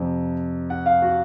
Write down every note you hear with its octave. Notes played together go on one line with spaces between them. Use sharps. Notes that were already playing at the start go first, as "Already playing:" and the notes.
Already playing: F2 C3 F3
F#5
F5
F#4